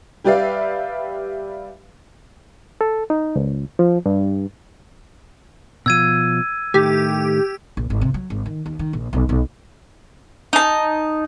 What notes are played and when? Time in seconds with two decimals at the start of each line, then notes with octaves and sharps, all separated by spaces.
0.24 G3 G4 B4 D5 E5 F5
2.81 A4
3.10 D#4
3.36 C#2
3.79 F3
4.06 G2
5.86 B2 F3 E6 G#6 D#7
6.74 A2 D#3 A3 G4
7.77 A#1
7.90 G#1
8.01 C3
8.14 F#3
8.30 G#1
8.46 D#3
8.66 D#2
8.79 D#3
8.93 A#1
9.13 B1
9.29 B1
10.53 D#4 A5